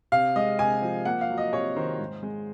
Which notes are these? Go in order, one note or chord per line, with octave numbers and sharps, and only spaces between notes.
C3 F5
G#3 D#5
C3 G#5
F3
A#3 F#5
F5
F#3
D#5
C3 C#5
D#3 C5
G#2
G#3